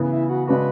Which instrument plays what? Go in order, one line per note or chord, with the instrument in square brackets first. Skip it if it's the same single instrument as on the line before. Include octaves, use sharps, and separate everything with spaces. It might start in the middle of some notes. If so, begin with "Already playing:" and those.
Already playing: [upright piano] C#3 E3 B3
[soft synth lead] E4
F#4
[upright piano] C#3 G#3 D4 F#4 [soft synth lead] B4